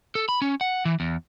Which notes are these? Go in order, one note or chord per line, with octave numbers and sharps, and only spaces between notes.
A4
B5
C#4
F#5
E3
E2